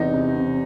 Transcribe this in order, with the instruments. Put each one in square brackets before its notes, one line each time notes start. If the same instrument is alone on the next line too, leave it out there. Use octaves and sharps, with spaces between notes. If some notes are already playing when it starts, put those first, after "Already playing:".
Already playing: [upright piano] E2 C3 D#4
C3
C3